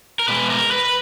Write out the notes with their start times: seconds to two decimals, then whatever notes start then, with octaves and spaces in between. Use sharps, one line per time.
0.19 A#4
0.28 B2 G#3 B4
0.50 A#4
0.71 B4